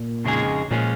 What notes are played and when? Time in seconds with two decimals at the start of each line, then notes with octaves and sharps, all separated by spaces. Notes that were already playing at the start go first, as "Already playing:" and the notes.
Already playing: A#2
0.25 F2 C#3 G#3 D#4 G#4
0.71 A#2 F3 G#3 C#4